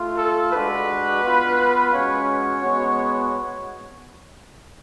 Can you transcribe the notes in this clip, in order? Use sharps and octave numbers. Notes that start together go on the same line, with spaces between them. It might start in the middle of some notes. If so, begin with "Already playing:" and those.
Already playing: A3 F4
A4
G#3 D4 F#4 B4
B3 F4
G#3 C#4 F#4 C#5
G#3 B3 F#4